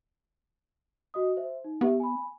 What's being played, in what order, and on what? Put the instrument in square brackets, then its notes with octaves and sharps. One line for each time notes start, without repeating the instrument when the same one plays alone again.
[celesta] F#4 D#5 D#6
C5 E5
D#4
[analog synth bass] B3 [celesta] G4 E5
[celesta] G#5 B5